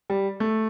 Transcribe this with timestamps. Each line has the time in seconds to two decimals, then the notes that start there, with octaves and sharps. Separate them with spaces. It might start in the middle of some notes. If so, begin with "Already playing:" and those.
0.10 G3
0.40 A3